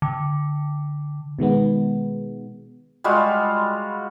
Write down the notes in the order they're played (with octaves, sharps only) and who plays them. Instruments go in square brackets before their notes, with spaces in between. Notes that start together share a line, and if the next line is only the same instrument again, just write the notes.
[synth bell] D3
[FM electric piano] B2 D#3 G#3 B3
[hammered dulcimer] G3 G#3 F4 F#4